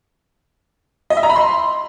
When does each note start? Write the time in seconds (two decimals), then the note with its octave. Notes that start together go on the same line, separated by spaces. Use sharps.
1.10 D#5
1.17 E5
1.23 A#5
1.30 B5
1.36 C6